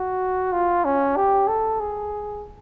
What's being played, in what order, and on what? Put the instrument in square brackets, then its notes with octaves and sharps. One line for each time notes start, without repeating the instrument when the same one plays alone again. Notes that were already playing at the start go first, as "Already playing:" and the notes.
Already playing: [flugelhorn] F#4
F4
C#4
G4
A4
G#4